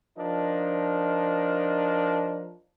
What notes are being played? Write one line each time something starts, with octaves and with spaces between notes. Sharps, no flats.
F3 D4 D#4 A#4